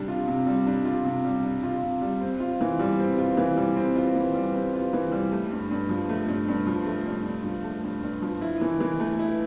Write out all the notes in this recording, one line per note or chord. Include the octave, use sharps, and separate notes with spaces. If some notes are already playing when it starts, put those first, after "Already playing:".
Already playing: C3 G3 D4
F4
C3
G3
D4
F4
C3
G3
D4
F4
C3
G3
C4
F4
E3
G3
C4
F4
E3
G3
C4
F4
E3
G3
C4
F4
E3
G3
A3
G2
G2
F3
A3
G2
G2
F3
A3
G2
G2
F3
A3
G2
G2
F3
E4
E3
E3
A3
E4